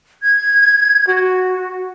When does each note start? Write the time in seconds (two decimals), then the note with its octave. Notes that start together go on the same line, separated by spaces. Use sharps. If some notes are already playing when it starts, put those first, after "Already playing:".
0.22 G#6
1.07 F#4